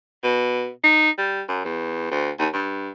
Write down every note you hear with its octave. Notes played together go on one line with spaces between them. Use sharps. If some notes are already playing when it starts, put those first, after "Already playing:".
B2
D#4
G3
F#2
E2
D2
D#2
G2